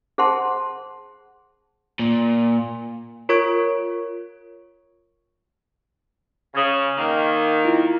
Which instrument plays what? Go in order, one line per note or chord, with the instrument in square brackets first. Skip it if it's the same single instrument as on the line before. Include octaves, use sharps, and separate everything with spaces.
[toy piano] G#4 C5 F#5 A5 C6
[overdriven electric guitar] A#2
[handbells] F4 A#4 C#5 C#6 G#6 D7
[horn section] C#3 [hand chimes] D#6 G#6
[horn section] D#3 A#3 [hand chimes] F6
[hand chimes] E4 F4